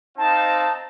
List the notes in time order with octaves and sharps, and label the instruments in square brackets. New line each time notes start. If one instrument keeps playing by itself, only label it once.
[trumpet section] C4 D#4 F5 [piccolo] A5